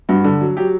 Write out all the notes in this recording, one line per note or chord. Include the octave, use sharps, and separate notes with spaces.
G2 F#4
D3
F#3
F#3 G4